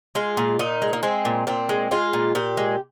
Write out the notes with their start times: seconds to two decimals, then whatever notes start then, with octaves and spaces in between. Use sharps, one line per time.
0.15 G#3 F4
0.37 A#2
0.59 A#2 D#4
0.82 G#3
0.93 A#3
1.03 G#3 C4
1.25 A#2
1.47 A#2 C4
1.69 G#3
1.91 G#3 F4
2.13 A#2
2.35 A#2 G4
2.57 G#3